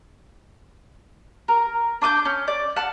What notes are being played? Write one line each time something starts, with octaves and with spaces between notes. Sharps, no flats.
A#4
D4 D6 D#6 G6
C#4
D5
F#5 A5 F6